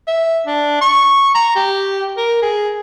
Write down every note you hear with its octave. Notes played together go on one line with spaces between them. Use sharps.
E5
D4
C#6
A#5
G4
A#4
G#4